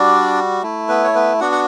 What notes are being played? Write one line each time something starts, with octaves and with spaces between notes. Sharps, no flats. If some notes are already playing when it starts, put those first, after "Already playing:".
Already playing: G3 D4 F#4 D5
A3 E4
B3 B4
C#5
B3 B4
B3 D4 F#4 F#5
F#5